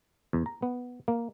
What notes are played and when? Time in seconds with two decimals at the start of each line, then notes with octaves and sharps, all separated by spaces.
0.33 E2
0.46 A#5
0.62 B3
1.08 A#3